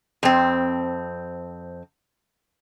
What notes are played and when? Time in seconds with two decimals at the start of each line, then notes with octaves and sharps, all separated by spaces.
0.23 F2 C4